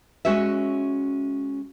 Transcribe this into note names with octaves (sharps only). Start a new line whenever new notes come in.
G#3 C#4 F#4 C#5 E5